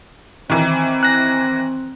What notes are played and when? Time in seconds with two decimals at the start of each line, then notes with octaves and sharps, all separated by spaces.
0.50 D#3 E3 C4
1.03 F#6 A#6